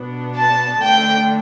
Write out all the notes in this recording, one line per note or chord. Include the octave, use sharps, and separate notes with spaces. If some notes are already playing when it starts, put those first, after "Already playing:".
Already playing: B2 B3 D4
A5
D3 A3 D4 G5